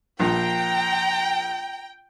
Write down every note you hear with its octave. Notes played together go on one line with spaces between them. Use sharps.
A#1 G5 A#5